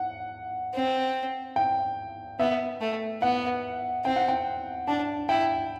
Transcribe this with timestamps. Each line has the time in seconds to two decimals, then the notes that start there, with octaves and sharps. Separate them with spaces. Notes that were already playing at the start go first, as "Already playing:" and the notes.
Already playing: F#5
0.74 C4
1.56 G5
2.40 B3 E5
2.81 A3
3.22 B3 F#5
4.05 C4 G5
4.16 F#5
4.28 G5
4.87 D4 A5
5.29 E4 G5